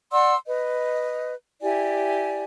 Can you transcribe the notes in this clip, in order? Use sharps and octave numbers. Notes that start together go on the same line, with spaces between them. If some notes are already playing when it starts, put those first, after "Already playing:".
D5 F#5 C6 E6
B4 D#5
E4 G4 D5 G#5